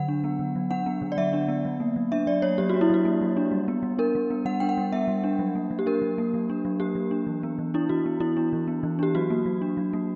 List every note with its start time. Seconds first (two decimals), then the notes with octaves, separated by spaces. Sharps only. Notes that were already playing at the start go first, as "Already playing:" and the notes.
Already playing: D3 F#3 F#5
0.08 D4
0.24 B3
0.39 D3
0.56 F#3
0.71 D4 F#5
0.86 B3
1.02 D3
1.12 D5
1.17 F#3 E5
1.33 D4
1.48 B3
1.65 F#3
1.80 A#3
1.96 F#3
2.12 D4 E5
2.27 F#3 D5
2.42 A#3 C#5
2.58 F#3 G4
2.69 F#4
2.74 D4
2.81 E4
2.90 F#3 F#4
3.05 A#3
3.21 F#3
3.37 D4
3.51 G3
3.68 B3
3.83 G3
3.99 D4 A#4
4.15 G3
4.31 B3
4.45 G3 F#5
4.60 D4 G5
4.69 F#5
4.77 G3
4.92 B3 E5
5.08 G3
5.23 D4
5.39 F#3
5.55 A#3
5.71 F#3
5.79 G4
5.86 D4 A#4
6.02 F#3
6.18 A#3
6.34 F#3
6.50 D4
6.65 F#3
6.80 A#3 G4
6.95 F#3
7.11 D4
7.27 E3
7.43 B3
7.59 E3
7.74 D4 E4
7.89 E3 F#4
8.06 B3
8.20 E3 E4
8.37 D4
8.53 E3
8.68 B3
8.83 E3
8.99 D4 G4
9.15 F#3 F#4
9.30 A#3
9.46 F#3
9.61 D4
9.77 F#3
9.93 A#3